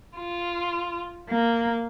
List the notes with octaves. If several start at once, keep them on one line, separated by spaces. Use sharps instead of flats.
F4
A#3